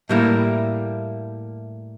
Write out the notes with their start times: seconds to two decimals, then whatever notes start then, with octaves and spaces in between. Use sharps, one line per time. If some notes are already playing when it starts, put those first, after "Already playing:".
0.09 A2 G3 A#3 E4